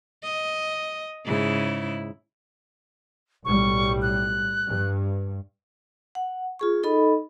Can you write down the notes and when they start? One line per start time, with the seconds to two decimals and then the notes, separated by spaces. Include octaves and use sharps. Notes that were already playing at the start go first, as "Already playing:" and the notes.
0.23 D#5
1.25 G#2 C#3 E4
3.45 B1 A2 G3 C#6
4.02 F#6
4.68 G2
6.15 F#5
6.59 F4 G#4 C#6
6.83 D#4 A4 D#5 B5